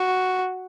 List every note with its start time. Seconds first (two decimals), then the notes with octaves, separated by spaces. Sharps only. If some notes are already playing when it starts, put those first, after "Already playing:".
Already playing: F#4